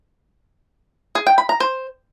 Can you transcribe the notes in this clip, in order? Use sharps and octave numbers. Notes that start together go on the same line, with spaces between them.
G#4
G5
B5
A#5
C5